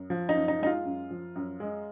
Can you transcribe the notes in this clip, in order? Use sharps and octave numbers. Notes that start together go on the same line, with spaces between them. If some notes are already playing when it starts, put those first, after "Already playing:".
Already playing: F#2
F3
D#4
F#2
D#4
G#3 D#4
F4
F#2
F3
F#2
G#3